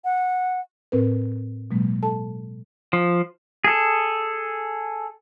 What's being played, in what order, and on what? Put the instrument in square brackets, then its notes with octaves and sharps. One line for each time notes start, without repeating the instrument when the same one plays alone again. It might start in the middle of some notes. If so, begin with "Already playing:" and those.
[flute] F#5
[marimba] A2 C4 A#4 B4
B2 F#3 G#3 A#3
A4 A5
[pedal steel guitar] F3
G#4 A4